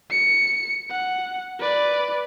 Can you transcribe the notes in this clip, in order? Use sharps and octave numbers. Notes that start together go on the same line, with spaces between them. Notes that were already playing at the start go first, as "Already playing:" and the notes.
C#7
F#5
B4 D5